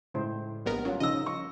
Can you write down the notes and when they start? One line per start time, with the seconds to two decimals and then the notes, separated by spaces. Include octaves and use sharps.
0.14 A2 C#3 G#3 C5
0.66 A#1 G3 B3 A#4
0.85 F#3 C#4 F4
1.00 C#3 F3 D#4 D#5 E6 A#6
1.26 C#6